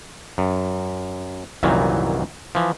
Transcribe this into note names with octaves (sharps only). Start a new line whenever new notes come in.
F#2
C2 F#2 A#2 D#3 E3 F#3
E3 F3